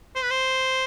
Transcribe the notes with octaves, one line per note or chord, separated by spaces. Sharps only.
C5
B4
C5